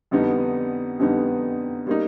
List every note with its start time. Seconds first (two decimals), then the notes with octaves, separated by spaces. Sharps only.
0.11 F2 D3 G3 B3 D#4
0.99 F2 D3 G3 B3 D#4
1.87 G3 A#3 D#4